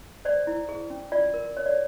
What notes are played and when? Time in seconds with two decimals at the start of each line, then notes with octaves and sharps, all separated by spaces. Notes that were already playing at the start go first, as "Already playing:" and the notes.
0.25 C5 D5
0.47 E4
0.69 G#4
0.90 C#4
1.12 F4 D5
1.34 A#4
1.57 C#5
1.66 D5